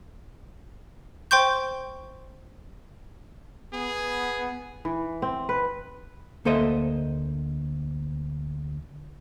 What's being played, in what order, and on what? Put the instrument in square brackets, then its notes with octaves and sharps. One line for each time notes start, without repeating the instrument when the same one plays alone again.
[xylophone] C5 G5 C6 C#6 G6
[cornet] B3 [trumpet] G#4
[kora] E3
C4
B4
[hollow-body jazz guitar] D2 A#3 A4 C5 D#5 E5